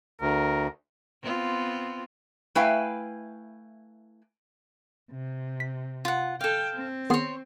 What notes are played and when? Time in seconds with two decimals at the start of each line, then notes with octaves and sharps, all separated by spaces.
0.21 D2 A#4
1.22 B3 C4 F4
2.55 A3 E4 B4 F5 G5 G#5
5.11 C3
5.60 B6
6.05 F4 F#5
6.41 A4 F5 G5
6.74 C4
7.10 D#3 B3 G#4 C#5 C6